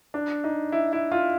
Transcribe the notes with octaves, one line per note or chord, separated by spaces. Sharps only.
D4
D#4
E4
E4
F4